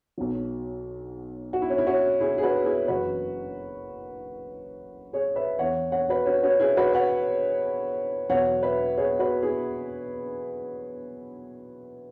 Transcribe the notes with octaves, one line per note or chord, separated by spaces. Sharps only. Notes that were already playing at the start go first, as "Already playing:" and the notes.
B1 B2 F#3
F#4
E4
C#4
E4
C#4 F#4
E4 G#4
G#4
F#4 B4
E4 G#4
F#1 F#2 E3 F#4 B4
G#4 C#5
B4 E5
E2 E3 C#5 F#5
C#5 F#5
F#4 B4
C#4 F#4
C#4 F#4
E4 G#4
F#4 B4
C#5 F#5
E2 B2 F#3 C#5 F#5
B4 E5
G#4 C#5
F#4 B4
E4 G#4